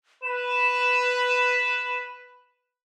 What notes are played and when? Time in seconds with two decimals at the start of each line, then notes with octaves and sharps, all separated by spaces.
0.23 B4 E7